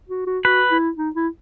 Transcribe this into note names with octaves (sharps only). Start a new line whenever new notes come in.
F#4
F#4
F#4 B4
E4
D#4
E4